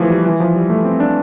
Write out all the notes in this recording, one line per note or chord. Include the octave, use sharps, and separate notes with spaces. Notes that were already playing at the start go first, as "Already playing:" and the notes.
Already playing: E3 F3 A3 A#3
G3
E3
F3
G3
A3
C4
D4